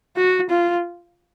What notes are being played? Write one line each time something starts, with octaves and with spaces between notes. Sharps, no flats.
F#4
F4